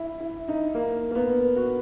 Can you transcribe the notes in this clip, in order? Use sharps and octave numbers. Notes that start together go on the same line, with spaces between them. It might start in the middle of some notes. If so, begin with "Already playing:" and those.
Already playing: E4
E4
D#4
A#3
A#3
B3
F#4